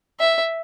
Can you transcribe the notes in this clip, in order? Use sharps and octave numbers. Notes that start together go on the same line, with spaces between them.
E5